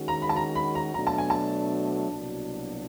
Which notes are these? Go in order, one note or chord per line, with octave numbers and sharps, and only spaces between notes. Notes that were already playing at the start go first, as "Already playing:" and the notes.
Already playing: D#3 G#3 C#4 F#4
A#5
B5
A5
A#5
B5
A#5
B2 F#3 A3 D4 A#5
A5
G#5
A5
C2 B2 F#3 A#3 D4